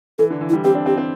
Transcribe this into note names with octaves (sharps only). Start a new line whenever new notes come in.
E3 A4
D3
E3
E4
G3
C4 G4
D4
C4 G4
C4